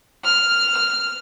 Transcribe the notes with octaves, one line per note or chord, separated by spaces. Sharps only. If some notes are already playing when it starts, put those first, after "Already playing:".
F6